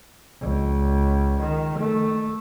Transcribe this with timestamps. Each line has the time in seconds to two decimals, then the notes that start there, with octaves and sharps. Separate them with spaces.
0.41 C#2
1.41 D#3
1.79 A3